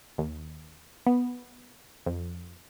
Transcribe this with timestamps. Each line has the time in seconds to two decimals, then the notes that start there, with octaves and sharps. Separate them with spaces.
0.18 D#2
1.06 B3
2.06 F2